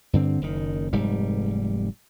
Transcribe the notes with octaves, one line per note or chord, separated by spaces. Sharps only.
G2 D3 C4
F#1 D#3
F1 G#2 G3